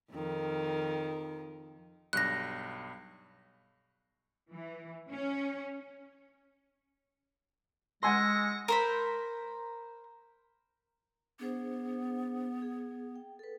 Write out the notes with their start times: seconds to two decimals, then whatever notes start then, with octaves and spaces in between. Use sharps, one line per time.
0.11 F2 D#3
2.13 B1 G2 F#6 A#6
4.51 E3
5.10 C#4
8.03 G#3 F#5 G#5 C6 E6 A#6 C#7
8.68 A#4 C5 B5
11.39 B3 D4 G#4 C5
12.62 G#4
13.16 G5
13.39 A4 B4